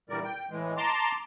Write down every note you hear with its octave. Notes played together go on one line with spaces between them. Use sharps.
A#2 D3 E3 G3 A#4 D5
G5
A2 E3 G#3
A5 A#5 C6 D6